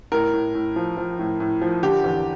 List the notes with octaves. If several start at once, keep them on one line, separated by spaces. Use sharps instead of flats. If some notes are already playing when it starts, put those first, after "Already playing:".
A2 A#4
A2
A2
F3
F3
A2
A2
F3
D3 G4
E2